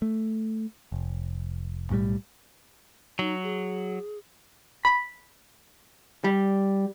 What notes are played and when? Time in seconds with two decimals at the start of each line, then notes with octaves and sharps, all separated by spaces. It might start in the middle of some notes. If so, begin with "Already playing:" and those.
0.02 A3
0.92 F1
1.90 B1 A2 F#3 G3
3.19 F#3 D#4
3.43 G#4
4.85 B5
6.24 G3